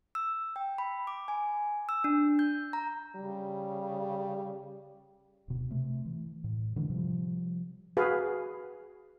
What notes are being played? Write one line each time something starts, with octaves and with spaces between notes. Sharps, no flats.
E6
G5
B5
D6
G#5
E6
D4
G6
A#5
C#3 G3
D1 B2
C3 A3
E3
A2
D3 E3 G#3
C3 F3 G3
F#4 G#4 B4 F5 G#5